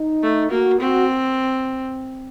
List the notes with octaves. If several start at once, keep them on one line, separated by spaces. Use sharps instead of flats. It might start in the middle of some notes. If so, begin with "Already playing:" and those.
Already playing: D#4
A3
A#3 F#4
C4 F#4